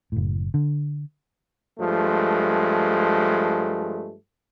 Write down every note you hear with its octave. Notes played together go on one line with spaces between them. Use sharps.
F#1 A2
D3
G2 F3 G#3 A3